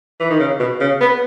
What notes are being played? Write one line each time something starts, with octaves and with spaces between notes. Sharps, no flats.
E3
D#3
C#3
B2
C#3
B3